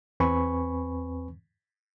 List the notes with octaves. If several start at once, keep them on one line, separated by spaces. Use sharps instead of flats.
E2 C4 B4 G#5 B5 C#6